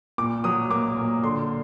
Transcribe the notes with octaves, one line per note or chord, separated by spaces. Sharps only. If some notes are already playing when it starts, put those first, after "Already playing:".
A#2 D6
F#3 D#6
A#3 D6
A#2
D3 C6